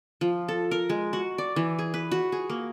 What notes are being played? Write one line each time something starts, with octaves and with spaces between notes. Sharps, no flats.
F3
A4
A#4
G#3
F#4
D5
E3
G#4
B4
F#4
G#4
A#3